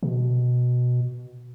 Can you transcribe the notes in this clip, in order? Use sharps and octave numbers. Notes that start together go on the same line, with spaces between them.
B2